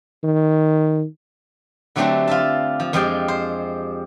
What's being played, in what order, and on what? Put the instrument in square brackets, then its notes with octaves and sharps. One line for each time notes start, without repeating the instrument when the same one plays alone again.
[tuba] D#3
[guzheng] D3 F#3 A3 C4 D4 G4
F4 E5 A5
F3
F2 F3 G#3 G4 G5
C5